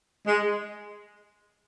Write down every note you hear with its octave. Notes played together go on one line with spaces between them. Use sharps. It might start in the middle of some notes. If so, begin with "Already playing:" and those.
G#3